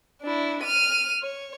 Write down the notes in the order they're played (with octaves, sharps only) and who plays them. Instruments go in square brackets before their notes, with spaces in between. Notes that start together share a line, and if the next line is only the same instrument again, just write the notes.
[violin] D4 E4
F6 D#7
C#5